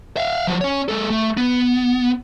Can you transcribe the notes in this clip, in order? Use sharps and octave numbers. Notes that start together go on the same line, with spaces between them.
E5 F5
F3 F#3
C#4 C#5
G#3 A4
A3
B3